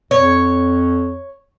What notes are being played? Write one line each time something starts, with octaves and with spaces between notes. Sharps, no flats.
F2 C#5